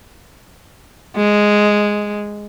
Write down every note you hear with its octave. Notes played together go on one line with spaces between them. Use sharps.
G#3